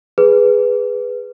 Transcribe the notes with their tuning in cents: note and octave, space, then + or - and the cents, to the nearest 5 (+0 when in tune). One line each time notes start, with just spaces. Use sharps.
G#4 -5 B4 +0